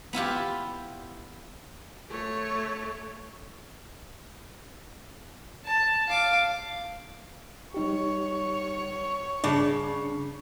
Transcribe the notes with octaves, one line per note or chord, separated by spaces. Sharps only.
B3 E4 F4 G4
A3 C#5
A5
F5 D6
G3 D#4 G4 C#5 C#6
G2 C#3 D4